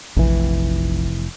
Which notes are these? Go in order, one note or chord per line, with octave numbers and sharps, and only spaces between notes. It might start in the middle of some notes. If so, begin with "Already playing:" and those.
F1 A#1 E3